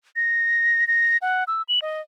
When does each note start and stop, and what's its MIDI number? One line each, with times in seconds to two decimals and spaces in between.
0.16 0.87 94
0.88 1.17 94
1.22 1.44 78
1.48 1.62 88
1.69 1.80 102
1.82 2.01 75